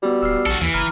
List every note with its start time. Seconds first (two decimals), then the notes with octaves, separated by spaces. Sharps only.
0.03 G3 B3 F#4
0.22 D1 E6 F6 C7
0.46 A#1 F#4 A4
0.61 D#2 E3
0.74 F#1 A#5 B5 F6